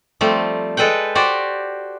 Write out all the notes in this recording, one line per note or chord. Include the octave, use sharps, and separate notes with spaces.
F3 G3 A3 C4
G#3 A4 B4 F#5 G5
F#4 G4 C5 D5